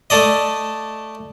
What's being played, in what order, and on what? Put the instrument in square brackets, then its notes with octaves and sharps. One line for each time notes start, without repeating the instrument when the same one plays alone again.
[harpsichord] A3 A4 D5 D#5